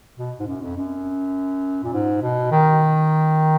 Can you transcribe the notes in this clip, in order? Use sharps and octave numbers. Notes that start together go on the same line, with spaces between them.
B2
G#2
F#2
F2
F#2
A#2
G#2
B2
D#3